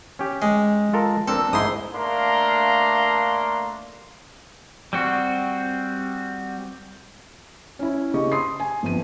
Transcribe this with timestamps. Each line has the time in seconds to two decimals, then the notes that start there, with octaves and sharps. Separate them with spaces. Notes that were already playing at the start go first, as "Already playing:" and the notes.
0.19 C#4 G4
0.42 G#3
0.93 F4 A4 A#4
1.28 C4 D4 A4 A#4
1.53 G#2 D#4 E4 C6 D#6
1.94 A3 A#3 D4 F5 A#5 C6
4.93 G3 C4 F#4
7.79 C#4 E4
8.14 C#3 G4 D#5 C#6
8.32 C6 D#6 C7
8.60 G#5
8.83 G1 F2 D#7